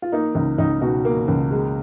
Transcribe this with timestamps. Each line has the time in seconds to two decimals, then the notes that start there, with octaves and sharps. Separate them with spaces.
0.02 F4
0.12 A#3 D#4
0.35 C#2 D#4
0.58 C#2 D#4
0.81 B2 D#4 F#4
1.05 A#3
1.28 C#2
1.51 G#3